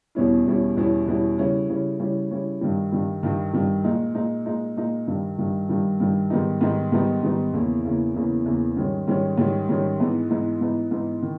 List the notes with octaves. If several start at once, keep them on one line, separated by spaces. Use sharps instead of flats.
E2 B2 G3 C#4 E4
E2 B2 G3 C#4 E4
E2 B2 G3 C#4 E4
E2 B2 G3 C#4 E4
C#3 G3 C#4 E4
C#3 G3 C#4 E4
C#3 G3 C#4 E4
C#3 G3 C#4 E4
G2 D#3 G3
G2 D#3 G3
G2 D#3 G3
G2 D#3 G3
A#2 G#3 D#4
A#2 G#3 D#4
A#2 G#3 D#4
A#2 G#3 D#4
G2 D#3 G3
G2 D#3 G3
G2 D#3 G3
G2 D#3 G3
G#2 D#3 G3 B3 D#4
G#2 D#3 G3 B3 D#4
G#2 D#3 G3 B3 D#4
G#2 D#3 G3 B3 D#4
E2 C#3 E3 A#3 E4
E2 C#3 E3 A#3 E4
E2 C#3 E3 A#3 E4
E2 C#3 E3 A#3 E4
G#2 D#3 G3 C#4
G#2 D#3 G3 C#4
G#2 D#3 G3 C#4
G#2 D#3 G3 C#4
G#2 E3 G#3 B3 D#4
G#2 E3 G#3 B3 D#4
G#2 E3 G#3 B3 D#4
G#2 E3 G#3 B3 D#4
D#3